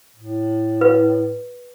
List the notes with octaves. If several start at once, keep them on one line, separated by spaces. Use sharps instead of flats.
A2
B4